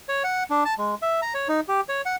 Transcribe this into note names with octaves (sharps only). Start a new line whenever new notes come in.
C#5
F#5
D4
A5
G#3
E5
A#5
C#5
D#4
G4
C#5
F#5